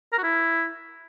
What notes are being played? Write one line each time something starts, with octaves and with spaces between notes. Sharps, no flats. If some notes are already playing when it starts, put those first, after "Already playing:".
A#4
F#4
E4